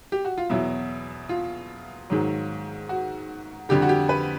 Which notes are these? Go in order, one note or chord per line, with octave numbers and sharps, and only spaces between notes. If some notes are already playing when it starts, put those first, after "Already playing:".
G4
F#4
F4
E2 B2 F#3 E4
F4
G#2 D#3 F#3
F#4
F2 D3 G3 G4
F#4
G4
B4